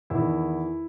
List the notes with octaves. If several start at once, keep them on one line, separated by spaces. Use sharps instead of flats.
E2 D#3 E4